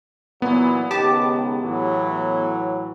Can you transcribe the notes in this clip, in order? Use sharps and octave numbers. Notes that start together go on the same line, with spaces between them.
A#2 E3 F#3 B3
C#2 G#2 D#3 G4 A5 D6
A2 E3 F#3